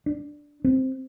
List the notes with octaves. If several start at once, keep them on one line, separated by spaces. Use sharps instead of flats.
D4
C4